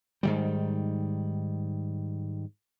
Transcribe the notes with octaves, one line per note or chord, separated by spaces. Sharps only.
G#2 D#3 G3